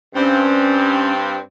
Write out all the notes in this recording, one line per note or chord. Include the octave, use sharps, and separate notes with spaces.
G2 C4 C#4